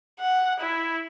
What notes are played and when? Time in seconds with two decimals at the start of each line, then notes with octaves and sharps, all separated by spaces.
0.20 F#5
0.60 E4